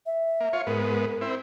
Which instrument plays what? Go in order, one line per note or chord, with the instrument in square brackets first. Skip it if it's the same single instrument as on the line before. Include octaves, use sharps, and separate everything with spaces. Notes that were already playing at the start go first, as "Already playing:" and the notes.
[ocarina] E5
[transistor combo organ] A#3
F4 C#5
[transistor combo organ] G#2 B3 [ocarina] A#4
[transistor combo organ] C4 E4